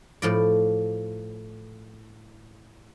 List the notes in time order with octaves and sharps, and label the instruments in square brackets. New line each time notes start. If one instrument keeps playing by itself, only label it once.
[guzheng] A2 F3 D5